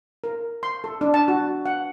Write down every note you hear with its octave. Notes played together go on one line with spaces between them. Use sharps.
A#4
C6
A4
D4
A5
F#4
F#5